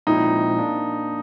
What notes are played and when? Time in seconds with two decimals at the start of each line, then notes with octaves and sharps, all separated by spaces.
0.07 A#2 F3 G#3 C4 D#4 E4
0.58 A#3 D4